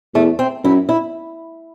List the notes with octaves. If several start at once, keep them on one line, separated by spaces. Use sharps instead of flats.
E2 A3
C4
F#2 E4
E4